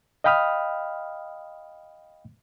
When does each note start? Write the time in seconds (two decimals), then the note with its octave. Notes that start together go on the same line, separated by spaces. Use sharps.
0.24 D#5 F5 G5 B5 D#6 F6